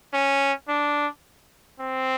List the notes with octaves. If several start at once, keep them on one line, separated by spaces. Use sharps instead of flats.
C#4
D4
C4